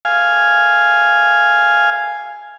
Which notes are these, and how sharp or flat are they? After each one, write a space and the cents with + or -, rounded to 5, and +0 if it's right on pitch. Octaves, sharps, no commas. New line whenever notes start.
F5 +0 G#5 +0